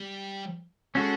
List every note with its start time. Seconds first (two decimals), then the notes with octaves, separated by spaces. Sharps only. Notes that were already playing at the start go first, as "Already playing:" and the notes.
Already playing: G3
0.95 G#3 C#4 F#4 A4